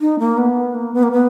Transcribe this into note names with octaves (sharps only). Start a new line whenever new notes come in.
D#4
A#3
B3
A#3
B3
A#3
B3